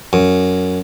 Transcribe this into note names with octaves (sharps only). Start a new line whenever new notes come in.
F#2